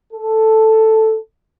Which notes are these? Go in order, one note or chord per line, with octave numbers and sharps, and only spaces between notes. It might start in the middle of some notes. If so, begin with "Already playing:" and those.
A4